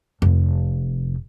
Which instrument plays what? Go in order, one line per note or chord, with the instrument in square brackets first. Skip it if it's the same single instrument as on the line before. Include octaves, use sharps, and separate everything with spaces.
[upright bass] F1